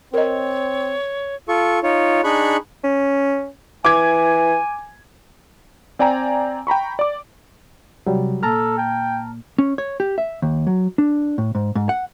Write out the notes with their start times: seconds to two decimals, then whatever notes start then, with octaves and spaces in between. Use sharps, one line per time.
0.14 C4 A#4 C#5 D#5
1.49 F4 A4 C#6
1.83 D#4 F4 C#5
2.24 D4 D#4 G#4 B5 C#6 F#6
2.84 C#4
3.85 E3 G#5 D6 G#6
5.99 C4 D5 G5 G#5 A#5
6.67 G5 A#5 B5 C#6
6.99 D5 D6
8.07 C3 F#3 G3
8.43 A#2 A4 A5 A#5 F6
8.78 G5
9.59 C#4
9.78 C#5
10.00 G4
10.18 E5
10.42 D#2
10.67 F#3
10.98 D4
11.38 A2
11.55 G#2
11.75 G#2
11.89 F#5